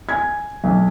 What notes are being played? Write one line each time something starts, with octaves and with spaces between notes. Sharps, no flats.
G#5 G#6
B1